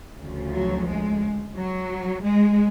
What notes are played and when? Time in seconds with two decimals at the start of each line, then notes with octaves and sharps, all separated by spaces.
0.20 D2 C#3 F3
0.53 F#3
0.88 G#3
1.56 F#3
2.23 G#3